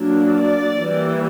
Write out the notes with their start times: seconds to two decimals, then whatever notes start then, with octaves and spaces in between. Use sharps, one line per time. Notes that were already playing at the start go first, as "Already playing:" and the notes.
Already playing: F#3 A#3 D4
0.34 D5
0.78 E3 G3 A#3